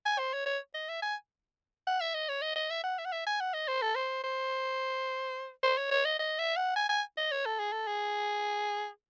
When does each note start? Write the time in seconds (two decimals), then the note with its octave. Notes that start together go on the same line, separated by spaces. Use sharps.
0.05 G#5
0.19 C5
0.33 C#5
0.46 C#5
0.74 D#5
0.89 E5
1.02 G#5
1.87 F#5
2.01 E5
2.14 D#5
2.29 C#5
2.42 D#5
2.56 D#5
2.70 E5
2.84 F#5
2.99 E5
3.05 F#5
3.12 E5
3.27 G#5
3.40 F#5
3.54 D#5
3.68 C5
3.82 A4
3.95 C5
4.24 C5
5.63 C5
5.78 C#5
5.91 C#5
6.05 D#5
6.19 D#5
6.38 E5
6.57 F#5
6.76 G#5
6.89 G#5
7.17 D#5
7.31 C#5
7.46 A4
7.59 G#4
7.72 A4
7.87 G#4